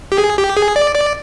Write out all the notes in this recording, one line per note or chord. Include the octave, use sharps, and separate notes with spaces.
G4
G#4
G4
G#4
D5
D5